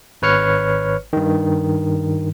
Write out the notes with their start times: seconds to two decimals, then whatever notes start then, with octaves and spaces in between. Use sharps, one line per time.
0.22 G#1 B4 C#5 F6 C#7
1.13 G2 D#3